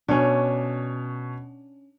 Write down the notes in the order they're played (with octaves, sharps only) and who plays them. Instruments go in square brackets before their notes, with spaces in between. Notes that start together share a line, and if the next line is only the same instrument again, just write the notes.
[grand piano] B2 C#5 [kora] C#4 D4